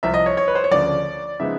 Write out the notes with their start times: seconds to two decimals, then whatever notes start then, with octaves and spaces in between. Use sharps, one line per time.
0.03 C2 C3 F3 E5
0.14 D#5
0.26 C#5
0.37 C#5
0.48 B4
0.55 C5
0.64 C#5
0.71 D2 C#3 F3 D5
1.40 C#3 F3 G#3 B3 D#4 E5